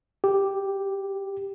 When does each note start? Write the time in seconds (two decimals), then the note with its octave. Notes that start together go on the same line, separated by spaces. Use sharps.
0.24 G4